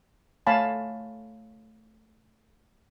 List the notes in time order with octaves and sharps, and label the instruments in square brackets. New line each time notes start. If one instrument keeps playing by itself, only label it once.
[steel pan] A3 C#5 F5 G#5 A5 B5